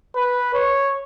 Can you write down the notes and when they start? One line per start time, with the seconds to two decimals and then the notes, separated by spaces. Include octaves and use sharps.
0.16 B4
0.54 C#5